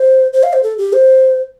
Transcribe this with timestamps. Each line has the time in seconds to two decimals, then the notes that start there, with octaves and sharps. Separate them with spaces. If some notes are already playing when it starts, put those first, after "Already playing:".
Already playing: C5
0.33 C5
0.43 F5
0.53 C5
0.63 A4
0.78 G4
0.93 C5